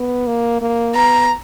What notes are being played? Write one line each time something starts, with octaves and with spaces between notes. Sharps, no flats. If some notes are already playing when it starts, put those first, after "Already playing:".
Already playing: B3
A#3
A#3
B3 A#5